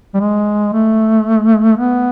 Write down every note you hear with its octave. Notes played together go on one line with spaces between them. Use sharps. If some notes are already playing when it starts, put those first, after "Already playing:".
G3
G#3
A3
B3